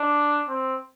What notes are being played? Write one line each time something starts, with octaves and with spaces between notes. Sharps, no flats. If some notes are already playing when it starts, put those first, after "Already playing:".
Already playing: D4
C4